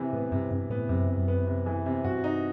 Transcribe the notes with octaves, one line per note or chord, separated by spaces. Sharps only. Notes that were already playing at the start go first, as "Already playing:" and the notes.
Already playing: C3 E3
A2 B3
G2 C3
G2 C3
A2 B3
F#2 C3
C3
F#2
B3
C3
E3
C3
G2 F#4
D#4